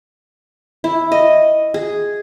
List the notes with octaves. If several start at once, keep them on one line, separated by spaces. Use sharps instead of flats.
E4
D#5
G#4